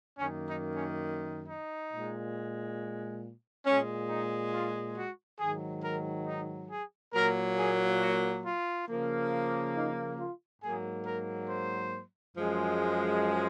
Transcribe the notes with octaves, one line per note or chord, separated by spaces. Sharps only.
F#2 D#3 A#3 C#4
D#4
C#4
D#4
A#2 G#3
A#2 G#3 C#4
D#4
F4
F#4
G#2 D#3 F#3 G#4
A#4
D#4
G#4
A#2 F#3 A#3 A#4
G#4
F#4
F4
C#3 F3 A#3
D#4
F4
G#2 F#3 A#3 G#4
A#4
C5
F#2 F3 G#3